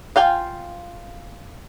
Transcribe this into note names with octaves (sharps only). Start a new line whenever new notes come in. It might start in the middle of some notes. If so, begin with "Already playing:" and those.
F4 F5 G5 G#5